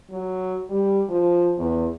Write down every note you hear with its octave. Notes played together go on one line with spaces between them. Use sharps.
F#3
G3
F3
E2